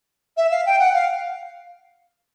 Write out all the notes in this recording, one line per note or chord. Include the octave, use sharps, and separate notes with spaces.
E5
F5
G5
F#5
F5